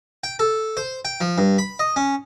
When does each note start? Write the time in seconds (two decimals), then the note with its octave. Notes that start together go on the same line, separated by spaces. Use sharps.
0.24 G5
0.39 A4
0.77 C5
1.05 G5
1.21 F3
1.38 G2
1.58 B5
1.79 D#5
1.96 C#4